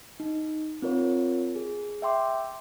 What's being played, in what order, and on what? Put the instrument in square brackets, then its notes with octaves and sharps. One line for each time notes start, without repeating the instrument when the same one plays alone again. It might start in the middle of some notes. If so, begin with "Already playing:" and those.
[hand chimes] D#4
C4 F4 A#4 C#5
G#4
E5 G5 C6 D6